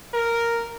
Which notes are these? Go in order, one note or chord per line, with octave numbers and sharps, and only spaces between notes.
A#4